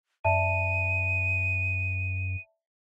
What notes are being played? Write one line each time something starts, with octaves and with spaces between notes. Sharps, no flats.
F#2 D5 E5 A5 D#7